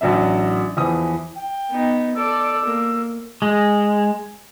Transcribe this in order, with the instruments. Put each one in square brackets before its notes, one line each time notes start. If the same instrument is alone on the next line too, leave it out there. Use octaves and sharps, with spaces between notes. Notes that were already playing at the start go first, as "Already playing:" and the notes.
[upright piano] A1 F#3 D4 E5
E2 E3 F3 D#6
[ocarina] G5
[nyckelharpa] B3 D#4
[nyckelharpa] A4 D5 [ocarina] E6
[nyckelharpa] A#3
[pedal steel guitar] G#3